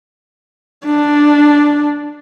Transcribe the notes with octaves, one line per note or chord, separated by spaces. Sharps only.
D4